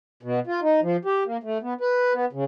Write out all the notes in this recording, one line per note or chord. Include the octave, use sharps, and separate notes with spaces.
B2
F4
D#4
F3
G4
A#3
A3
B3
B4
B3
C#3